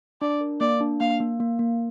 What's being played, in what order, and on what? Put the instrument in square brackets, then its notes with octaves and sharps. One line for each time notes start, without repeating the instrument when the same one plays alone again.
[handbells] D4 [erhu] D5
[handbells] A#4
[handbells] A#3 [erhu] D5
[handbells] D4
[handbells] A#3 [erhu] F5
[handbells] A#3
A#3
A#3